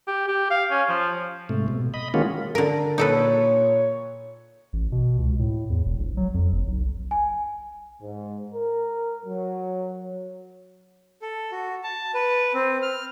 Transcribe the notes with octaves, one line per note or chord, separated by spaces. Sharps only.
G4
G4
F5
C#4
F3
G#2 C3 A3
B2
D#5 B5
D#3 G#3 A#3 C#4 F4 F#4
D3 A#4
A#2 D#4 A4 B4 C#5
A1
B2
C#2
A2
E2
E1
A#1
F#3
F2
F#1
B1
G#5
G#2
A#4
F#3
A4
F#4
A5
B4
C4
F6